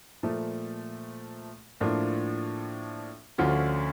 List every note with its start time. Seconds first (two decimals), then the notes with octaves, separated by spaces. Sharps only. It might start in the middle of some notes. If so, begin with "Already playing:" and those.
0.23 A#2 F3 A3
1.80 A2 F3 A#3 D4 F4
3.38 D2 D3 F3 C#4 F4